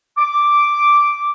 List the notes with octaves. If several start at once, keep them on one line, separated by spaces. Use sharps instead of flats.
D6